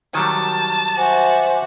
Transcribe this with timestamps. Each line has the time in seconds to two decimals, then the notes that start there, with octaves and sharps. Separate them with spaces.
0.15 D#3 F#3 G3 A5
0.97 F#4 C5 E5 G#5 D6